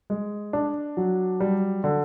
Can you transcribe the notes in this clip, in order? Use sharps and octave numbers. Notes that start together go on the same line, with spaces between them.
G#3
D4
F#3
G3
D3